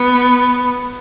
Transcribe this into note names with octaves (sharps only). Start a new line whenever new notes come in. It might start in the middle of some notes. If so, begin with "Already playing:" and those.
Already playing: B3